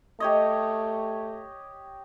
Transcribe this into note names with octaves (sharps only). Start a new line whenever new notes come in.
A3 G4 C#5 D#5